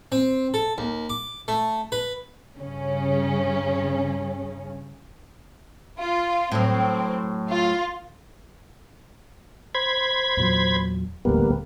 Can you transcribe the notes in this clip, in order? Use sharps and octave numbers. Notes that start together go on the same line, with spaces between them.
C4
A4
D#2
D6
A3
B4
G2 C#3 C#4
F4
A2 F#3 C4
F4
C5 B5 G#6
E2 A#2 F#3
D#1 A1 D2 G3 A#3 B3